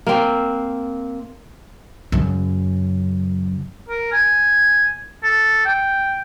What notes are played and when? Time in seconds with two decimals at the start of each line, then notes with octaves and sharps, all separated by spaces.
0.07 A#3 C4
2.12 F#2 C#3
3.89 A#4
4.12 G#5
5.23 A4
5.66 G5